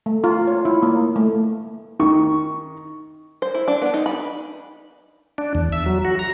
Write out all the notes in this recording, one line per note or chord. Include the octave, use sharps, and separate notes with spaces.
A3
F4
C#5
E4
A#3
A3
D#3 C#6
C5
E4
D4
B3
D#4
B5
D4
E2
E5
F#3
F#4
A#5